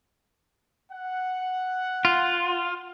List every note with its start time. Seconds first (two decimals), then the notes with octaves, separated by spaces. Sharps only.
0.92 F#5
2.05 F4